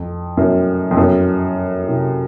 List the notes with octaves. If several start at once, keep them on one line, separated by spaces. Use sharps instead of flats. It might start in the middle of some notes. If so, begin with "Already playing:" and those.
Already playing: F2
F#2
F2
F#2
C3